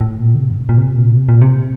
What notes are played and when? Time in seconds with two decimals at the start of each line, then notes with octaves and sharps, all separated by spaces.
0.01 A2
0.20 A#2
0.35 D3
0.39 C3
0.51 G2
0.60 A2
0.69 A#2
0.77 C3
0.97 A#2
1.17 C3
1.29 A#2
1.41 C3